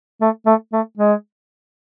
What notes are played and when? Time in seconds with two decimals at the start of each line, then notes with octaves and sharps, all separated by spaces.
0.21 A3
0.46 A3
0.73 A3
0.98 G#3